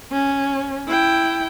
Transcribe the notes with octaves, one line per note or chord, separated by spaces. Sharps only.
C#4
E4 G5